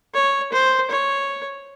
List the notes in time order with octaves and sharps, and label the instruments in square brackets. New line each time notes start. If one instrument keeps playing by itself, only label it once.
[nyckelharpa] C#5
C5
C#5